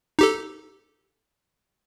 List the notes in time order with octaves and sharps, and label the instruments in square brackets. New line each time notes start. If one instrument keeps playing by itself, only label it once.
[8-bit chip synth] D#4 G4 A4